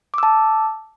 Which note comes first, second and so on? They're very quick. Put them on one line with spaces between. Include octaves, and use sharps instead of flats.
D6 E6 A5